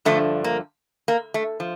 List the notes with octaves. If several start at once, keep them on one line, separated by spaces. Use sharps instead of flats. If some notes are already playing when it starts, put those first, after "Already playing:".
G2 D3 F3 A3
A#3
A#3
A3
F3